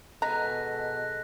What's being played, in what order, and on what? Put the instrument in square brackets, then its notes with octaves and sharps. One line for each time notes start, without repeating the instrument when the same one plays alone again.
[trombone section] B2 A4 [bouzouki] G#3 D#4 [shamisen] A#5 [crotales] F#6 A#6 B6